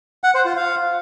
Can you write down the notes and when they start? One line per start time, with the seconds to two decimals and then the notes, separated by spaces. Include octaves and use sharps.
0.24 F#5
0.35 C5
0.45 F4
0.56 F5